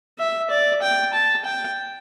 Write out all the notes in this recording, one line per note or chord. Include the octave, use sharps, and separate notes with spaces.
E5
D5
G5
A5
G5